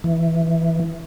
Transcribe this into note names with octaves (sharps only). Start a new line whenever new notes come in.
E3